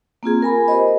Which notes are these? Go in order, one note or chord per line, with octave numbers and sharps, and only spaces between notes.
A#3 C4 F4 G#4
A#4 G#5 B5
G4 A#4 C5 D#5